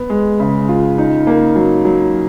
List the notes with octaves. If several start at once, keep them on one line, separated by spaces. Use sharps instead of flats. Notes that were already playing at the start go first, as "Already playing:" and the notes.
Already playing: B3
G#3
C#3
F4
D#4
A#3
F#3
F#3